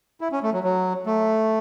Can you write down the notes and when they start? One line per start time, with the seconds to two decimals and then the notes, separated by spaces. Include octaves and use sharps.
0.21 E4
0.32 C#4
0.43 A3
0.53 F#3
0.63 F#3
1.06 A3